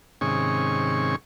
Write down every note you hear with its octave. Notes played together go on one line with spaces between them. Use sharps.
G#2 C3 D#3 C#4 G#4 C#6